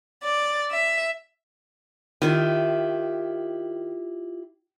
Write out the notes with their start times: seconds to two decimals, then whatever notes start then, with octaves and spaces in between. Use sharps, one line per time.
0.24 D5
0.71 E5
2.22 D#3 E4 F4 G4